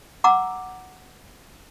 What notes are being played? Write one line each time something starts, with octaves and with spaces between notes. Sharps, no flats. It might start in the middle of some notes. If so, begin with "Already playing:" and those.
F#5 A#5 D6 E6